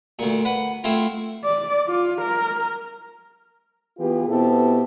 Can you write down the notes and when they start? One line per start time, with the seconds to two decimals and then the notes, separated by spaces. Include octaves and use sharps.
0.19 D2 A#2
0.45 B4 F#5
0.84 A3 C4 E4 F4
1.44 D5
1.88 F4
2.21 A#4
3.99 E3 B3 F4 G4 G#4 B4
4.28 B2 B3 C4 E4 G4 A4